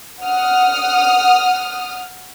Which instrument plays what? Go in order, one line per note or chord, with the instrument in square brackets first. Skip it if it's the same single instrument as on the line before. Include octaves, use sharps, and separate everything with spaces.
[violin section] F#5 D#6 F6